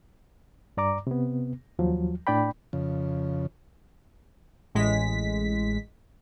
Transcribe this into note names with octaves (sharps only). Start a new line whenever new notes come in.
G2 D5 A#5 D6
C3 B3
D#2 F3 F#3
A2 D4 D5 G5 B5
F2 C#3
A1 A2 G#3 B6